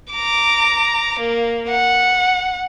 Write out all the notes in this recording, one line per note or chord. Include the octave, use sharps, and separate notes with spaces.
A#5 D6
A#3
F#5